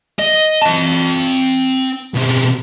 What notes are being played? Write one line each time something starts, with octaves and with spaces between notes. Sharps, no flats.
D#5
C4 A5
B2 C4